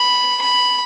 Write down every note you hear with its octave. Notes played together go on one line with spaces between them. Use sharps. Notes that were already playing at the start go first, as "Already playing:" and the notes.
Already playing: B5
B5